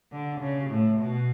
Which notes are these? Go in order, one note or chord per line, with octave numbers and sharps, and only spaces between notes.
D3
C#3
A2
B2